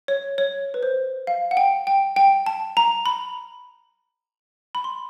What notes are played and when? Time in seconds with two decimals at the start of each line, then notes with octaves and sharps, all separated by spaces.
0.08 C#5
0.38 C#5
0.74 B4
0.83 C5
1.27 F5
1.51 F#5
1.57 G5
1.87 G5
2.16 G5
2.46 A5
2.77 A#5
3.06 B5
4.75 B5
4.84 C6